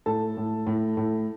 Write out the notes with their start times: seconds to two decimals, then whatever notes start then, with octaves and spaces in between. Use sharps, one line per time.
0.06 A2 A4 A5
0.37 A2
0.67 A2
0.97 A2